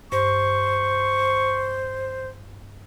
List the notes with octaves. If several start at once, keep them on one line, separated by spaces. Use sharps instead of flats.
G2 C5 C#6